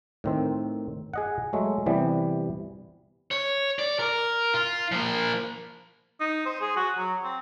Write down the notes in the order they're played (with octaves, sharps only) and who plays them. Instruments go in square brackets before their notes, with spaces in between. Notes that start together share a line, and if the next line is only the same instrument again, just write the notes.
[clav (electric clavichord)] A2 D#3 C4
G#4 D#5 F#5
F#3 G#3 A3
C3 E3 G3 B3
[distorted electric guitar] C#5
D5
A#4
F4
F3 A#3
[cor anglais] D#4
C5
G#4
F#4
F#3
C4